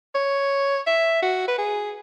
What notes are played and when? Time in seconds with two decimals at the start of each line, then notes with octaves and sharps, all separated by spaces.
0.15 C#5
0.87 E5
1.22 F#4
1.48 B4
1.58 G#4